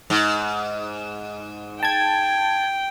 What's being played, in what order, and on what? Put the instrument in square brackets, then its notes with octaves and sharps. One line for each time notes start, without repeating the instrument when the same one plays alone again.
[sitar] G#2
[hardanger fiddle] G5 [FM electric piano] A5 G#6